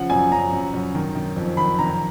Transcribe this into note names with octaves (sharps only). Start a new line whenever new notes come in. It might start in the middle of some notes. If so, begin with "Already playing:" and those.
Already playing: C#3 F3 F#5
F#2 G#5
F#2 A#5
F#2
F#2
D#3
D#3
F2
D#3 B5
D#3 A#5